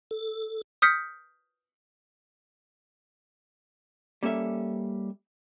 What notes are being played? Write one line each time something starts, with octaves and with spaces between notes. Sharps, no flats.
A4
D#6 F6 G6 B6 C#7
G3 A#3 C#4 A4 E5